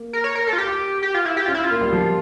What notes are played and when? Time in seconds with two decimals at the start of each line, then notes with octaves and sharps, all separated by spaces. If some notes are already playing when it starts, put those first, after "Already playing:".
Already playing: A#3
0.13 A#4
0.24 C#5
0.35 A#4
0.47 A4
0.53 F4
0.58 G4
1.03 G4
1.14 F4
1.25 E4
1.37 G4
1.46 C#4 F4
1.55 E4
1.64 F4
1.71 A#3
1.81 G3
1.93 F3